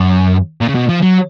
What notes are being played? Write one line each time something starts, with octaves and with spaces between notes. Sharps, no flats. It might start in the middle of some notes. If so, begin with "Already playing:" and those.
Already playing: F#2
A#2
C#3
B2
F3
F#3